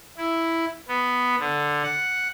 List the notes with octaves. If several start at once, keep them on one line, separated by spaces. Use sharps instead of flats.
E4
B3
D3
F#5